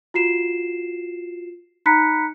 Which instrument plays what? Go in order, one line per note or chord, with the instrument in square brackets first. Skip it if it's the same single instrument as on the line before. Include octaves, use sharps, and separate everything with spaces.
[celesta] F4 F#4 C7 E7
D#4 A#5 B5 F#6 B6 C#7